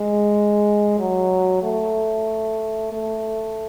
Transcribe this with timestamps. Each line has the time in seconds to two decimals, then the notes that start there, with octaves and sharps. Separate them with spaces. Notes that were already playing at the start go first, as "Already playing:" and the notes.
Already playing: G#3
0.99 F#3
1.63 A3
2.93 A3